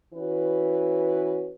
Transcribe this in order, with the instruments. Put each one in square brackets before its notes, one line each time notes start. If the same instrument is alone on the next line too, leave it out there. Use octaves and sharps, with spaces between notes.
[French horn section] E3 C#4 F#4 B4